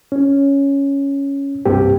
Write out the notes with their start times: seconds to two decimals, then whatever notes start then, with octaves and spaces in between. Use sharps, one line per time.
0.12 C#4
1.66 C2 G2 A#3 C4 G4